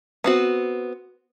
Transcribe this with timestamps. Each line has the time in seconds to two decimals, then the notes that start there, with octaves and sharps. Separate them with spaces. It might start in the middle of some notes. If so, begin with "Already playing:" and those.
0.24 B3 C4 F#4